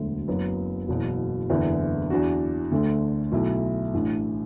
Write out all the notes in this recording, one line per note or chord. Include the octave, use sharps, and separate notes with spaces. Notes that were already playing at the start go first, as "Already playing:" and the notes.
Already playing: E1 D2 D3 F#3 A3
F#1 F#2 F#3 B3 F#4
F#1 E2 B2 F#3
F#1 E2 D3 B3 E4
E2 E3 D4 F#4
D2 D3 A3 D4
B1 B2 A3 E4
A1 A2 E3 D4